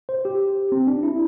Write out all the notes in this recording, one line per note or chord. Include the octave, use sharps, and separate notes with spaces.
C5
G4
C4
D4
E4